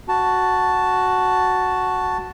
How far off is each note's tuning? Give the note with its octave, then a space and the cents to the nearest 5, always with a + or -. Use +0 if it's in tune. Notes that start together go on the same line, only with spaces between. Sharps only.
F#4 +0 A5 +0